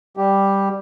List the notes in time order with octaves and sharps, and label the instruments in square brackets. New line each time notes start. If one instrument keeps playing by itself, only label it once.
[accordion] G3 G4